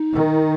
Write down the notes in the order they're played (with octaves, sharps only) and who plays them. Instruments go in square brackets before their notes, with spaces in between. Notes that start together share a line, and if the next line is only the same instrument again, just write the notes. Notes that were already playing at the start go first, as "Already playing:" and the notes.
Already playing: [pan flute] D#4
[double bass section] D#3